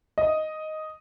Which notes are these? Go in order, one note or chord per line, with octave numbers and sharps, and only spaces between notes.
D#5